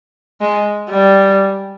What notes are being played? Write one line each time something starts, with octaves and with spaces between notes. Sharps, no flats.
G#3
G3